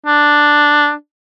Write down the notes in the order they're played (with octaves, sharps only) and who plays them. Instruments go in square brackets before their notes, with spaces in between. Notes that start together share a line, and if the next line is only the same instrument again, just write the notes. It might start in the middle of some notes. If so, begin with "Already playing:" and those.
[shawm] D4